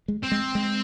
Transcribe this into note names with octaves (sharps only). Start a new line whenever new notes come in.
G#3
C4
G#3
G#3